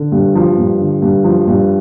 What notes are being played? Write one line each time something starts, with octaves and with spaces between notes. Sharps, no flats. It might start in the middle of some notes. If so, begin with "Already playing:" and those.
Already playing: D3
G2
F3
G2
D3
G2
F3
G2